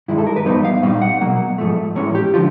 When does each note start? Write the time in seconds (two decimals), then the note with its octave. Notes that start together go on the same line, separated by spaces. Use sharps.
0.08 G2 D#3 G#3 E4
0.18 A4
0.27 A#4
0.36 B4
0.45 G2 E3 G3 B3 D#4 C5
0.65 F5
0.82 A#2 G3 C4 D#4 F5
1.02 F#5
1.21 B2 F#3 A#3
1.58 G#2 F3 A3
1.96 A2 E3 G#3 C#4 C#5
2.15 G4
2.34 D3 F3 F4